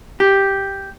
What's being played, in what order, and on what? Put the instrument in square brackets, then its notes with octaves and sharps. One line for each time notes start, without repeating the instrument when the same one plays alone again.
[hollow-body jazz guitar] G4